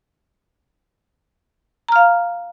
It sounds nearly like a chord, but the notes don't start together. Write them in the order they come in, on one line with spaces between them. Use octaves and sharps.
A#5 F6 F5